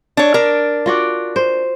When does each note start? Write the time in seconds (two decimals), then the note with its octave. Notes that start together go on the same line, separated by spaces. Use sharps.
0.17 D4 C#5
0.34 D4 A#4
0.86 F4 F#4 D5
1.36 C5